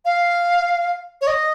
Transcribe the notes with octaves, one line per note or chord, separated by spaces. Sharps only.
F5
C#5
D#5